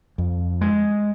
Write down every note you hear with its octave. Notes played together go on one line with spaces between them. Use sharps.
F2
G#3